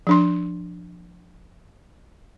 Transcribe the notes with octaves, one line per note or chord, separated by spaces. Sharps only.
F3 D4 C6